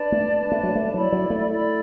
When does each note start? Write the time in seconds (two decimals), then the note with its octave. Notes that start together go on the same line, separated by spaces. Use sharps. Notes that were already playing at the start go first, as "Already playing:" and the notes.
Already playing: D4 B4 D5 A5
0.12 A3
0.39 D4 B4 D5 A5
0.52 A3
0.63 F#3
0.75 A3
0.94 F#3 E4 D5 B5
1.12 F#3
1.30 A3
1.49 E4 D5 B5